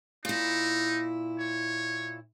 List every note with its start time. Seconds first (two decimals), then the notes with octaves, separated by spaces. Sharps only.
0.25 A#2 D#4 E4
1.39 C#5